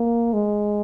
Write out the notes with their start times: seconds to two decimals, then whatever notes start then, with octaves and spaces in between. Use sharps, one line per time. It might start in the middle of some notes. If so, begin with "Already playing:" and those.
Already playing: A#3
0.34 G#3